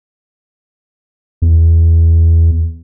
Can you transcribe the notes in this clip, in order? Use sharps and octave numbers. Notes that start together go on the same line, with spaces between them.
E2